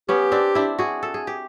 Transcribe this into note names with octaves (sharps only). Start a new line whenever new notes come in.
B3 C#4 G4
C4 D4
D4 E4
F#4 G#4
A4
G#4
G4